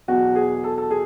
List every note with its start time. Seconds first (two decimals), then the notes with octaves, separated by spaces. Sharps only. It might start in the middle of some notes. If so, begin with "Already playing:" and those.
0.08 E2 B2 F#3 F#4
0.35 G#4
0.64 A4
0.78 A4
0.91 G#4